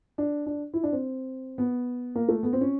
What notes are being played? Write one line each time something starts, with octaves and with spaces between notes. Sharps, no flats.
D4
D4
E4
D4
C4
B3
A#3
A3
B3
C4
C#4